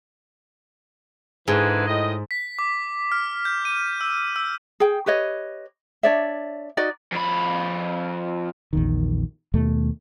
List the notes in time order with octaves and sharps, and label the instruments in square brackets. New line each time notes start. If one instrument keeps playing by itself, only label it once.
[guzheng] G#2 [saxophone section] D3 E3 G#4
[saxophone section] A2 D#5
[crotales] B6
D6
F6
G6
D#7
E6
E6
[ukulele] G#4 G5
G4 B4 C#5 D#5
D4 C#5 D5 E5
D#4 F#4 D5 D#5
[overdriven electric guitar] F2 B5
[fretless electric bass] A#1 E2 D#3
D#2 B2 A3